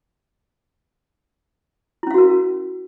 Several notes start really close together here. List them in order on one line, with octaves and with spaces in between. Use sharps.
E4 C#4 F5 F#4 A#4